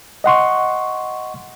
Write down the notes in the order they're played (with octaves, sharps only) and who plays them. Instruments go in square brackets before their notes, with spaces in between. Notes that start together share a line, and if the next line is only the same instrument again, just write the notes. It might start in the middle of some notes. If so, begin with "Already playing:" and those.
[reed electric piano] D#5 F#5 C6 C#6